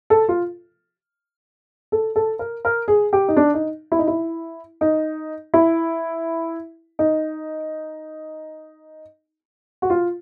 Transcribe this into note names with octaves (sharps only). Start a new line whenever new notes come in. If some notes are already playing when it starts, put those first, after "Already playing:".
A4
F4
A4
A4
A#4
A#4
G#4
G4
D#4
D4
D#4
E4
D#4
E4
D#4
E4
D#4
F#4
F4